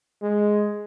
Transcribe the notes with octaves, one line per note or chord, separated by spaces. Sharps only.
G#3